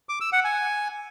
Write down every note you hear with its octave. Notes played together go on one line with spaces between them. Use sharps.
D6
E6
F#5
G#5